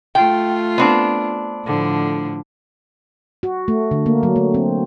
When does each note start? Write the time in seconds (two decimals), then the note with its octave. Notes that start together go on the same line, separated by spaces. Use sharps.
0.15 A3 F4 G5
0.78 B3 C4 D4
1.65 A2 D3 F3
3.43 F#4
3.68 A3
3.91 D3
4.06 A#3
4.23 F#3
4.36 A3
4.54 C4